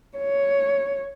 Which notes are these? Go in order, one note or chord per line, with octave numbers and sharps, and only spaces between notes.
C#5